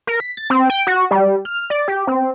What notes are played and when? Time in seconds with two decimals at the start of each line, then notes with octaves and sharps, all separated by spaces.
0.07 A#4
0.20 B6
0.37 A6
0.50 C4
0.70 G5
0.87 F#4
1.11 G3
1.45 F6
1.70 D5
1.88 G4
2.07 C4